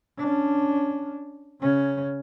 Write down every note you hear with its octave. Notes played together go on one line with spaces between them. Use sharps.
C#4 D4
C#3 C#4